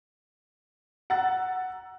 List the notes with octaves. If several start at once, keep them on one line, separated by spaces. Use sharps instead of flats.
F#5 A#5 E6 A6